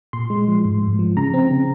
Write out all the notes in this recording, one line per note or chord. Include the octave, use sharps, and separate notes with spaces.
A#2 C6
G#3
F3
G#2
G#2
F3
C#3 A#5
C4
C#3